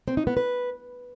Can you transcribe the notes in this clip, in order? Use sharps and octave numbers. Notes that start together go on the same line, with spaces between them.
C4
D#4
B3
B4